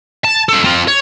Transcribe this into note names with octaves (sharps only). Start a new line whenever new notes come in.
A5
A4 C5
C4 F4
C#5